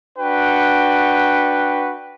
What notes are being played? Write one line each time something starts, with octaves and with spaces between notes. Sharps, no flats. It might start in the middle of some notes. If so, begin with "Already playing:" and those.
D4 F#4 B4 F#5 G5